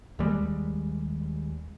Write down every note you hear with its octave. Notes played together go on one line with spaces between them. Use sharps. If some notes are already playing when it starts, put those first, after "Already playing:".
D#2 G3 G#3